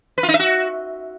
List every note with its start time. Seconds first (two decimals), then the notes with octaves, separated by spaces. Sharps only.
0.18 B4
0.23 F4
0.28 D#4
0.34 E5
0.39 F#4